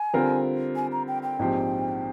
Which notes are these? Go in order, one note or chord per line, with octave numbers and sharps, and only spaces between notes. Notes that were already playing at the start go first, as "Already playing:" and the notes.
Already playing: G#5
D3 G3 C4 F4 A#4
G#5
A#5
G5
G5
A#1 G#2 F3 C4 G4